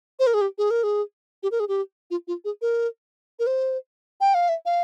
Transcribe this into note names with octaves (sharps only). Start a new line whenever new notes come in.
C5
A#4
G#4
G4
G#4
A#4
G#4
G4
A#4
G#4
G4
F4
F4
G#4
A#4
A#4
C5
G5
F5
E5
F5